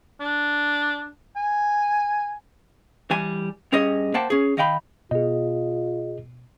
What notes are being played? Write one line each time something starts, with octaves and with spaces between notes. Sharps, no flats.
D4
G#5
E3 G3 G#5
G2 C#4 G#4 D#5
A#3 C5 F#5 G5 A5
C#4 G#4
D#3 D#5 F5 G5 B5
B2 F4 G#4 D#5